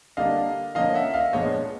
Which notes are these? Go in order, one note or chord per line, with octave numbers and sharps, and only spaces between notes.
D3 G3 A#3 D4 D#5 F5
D3 F3 A#3 C#4 D#5 F5
E5 F#5
D#5 F5
A#2 F3 G#3 B3 D4 C#5 D#5